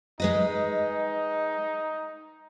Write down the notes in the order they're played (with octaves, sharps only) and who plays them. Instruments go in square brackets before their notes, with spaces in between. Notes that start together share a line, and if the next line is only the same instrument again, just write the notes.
[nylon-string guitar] G#3 B4 D#5 [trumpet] D#4